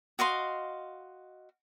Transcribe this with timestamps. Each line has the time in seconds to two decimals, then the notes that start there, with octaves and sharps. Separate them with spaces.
0.19 F#4 D#5 F5 C6